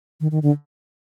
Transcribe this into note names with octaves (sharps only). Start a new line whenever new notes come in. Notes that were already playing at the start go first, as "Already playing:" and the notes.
D#3
D#3
D3